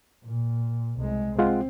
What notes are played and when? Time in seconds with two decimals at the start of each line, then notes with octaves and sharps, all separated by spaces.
0.25 A#2
0.99 C2 G#3
1.39 G#3 C4 F4 F#5